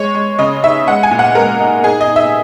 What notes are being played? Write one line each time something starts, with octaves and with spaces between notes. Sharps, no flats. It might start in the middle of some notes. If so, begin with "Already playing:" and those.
Already playing: G#3 C#5
G#3
C#3 D#5
D#4 E5
G#3 F#5
G#5
A#2
F#5
G#3 A#4
D#4
D#4 G#4
D#5
D#4
E5